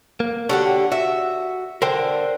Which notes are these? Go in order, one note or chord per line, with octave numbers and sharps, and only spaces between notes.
A#3
D3 D4 F#4 G4 C#5 F#5
F#4 E5
D3 A#4 C5 G5